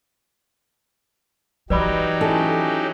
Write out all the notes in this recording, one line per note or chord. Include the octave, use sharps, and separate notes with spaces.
E3 F#3 D#4 G4 B4 D5 B5
C#4 E4 A4